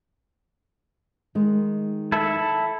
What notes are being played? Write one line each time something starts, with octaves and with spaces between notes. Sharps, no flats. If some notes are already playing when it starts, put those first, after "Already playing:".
D#3 G#3
E4 A4 E5